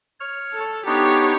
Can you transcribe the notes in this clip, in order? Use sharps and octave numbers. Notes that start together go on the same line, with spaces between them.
C#5 F6
A4
B3 D4 D#4 G4 C#5